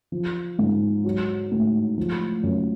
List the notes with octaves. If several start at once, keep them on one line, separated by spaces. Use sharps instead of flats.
F3
G#2
F#3
A2
F3
F#2